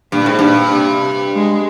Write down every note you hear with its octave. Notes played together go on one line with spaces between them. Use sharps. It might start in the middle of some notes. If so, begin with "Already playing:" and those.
G2 A#2
G#2
G2 A#2
C3
G#3